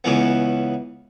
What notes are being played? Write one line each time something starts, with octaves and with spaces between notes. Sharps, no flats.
C#2 C#3 E3 B3